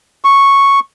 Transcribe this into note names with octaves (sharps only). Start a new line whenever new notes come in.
C#6